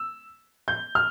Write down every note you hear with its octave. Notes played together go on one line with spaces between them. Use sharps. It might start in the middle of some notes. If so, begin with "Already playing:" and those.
Already playing: E6
G6
F6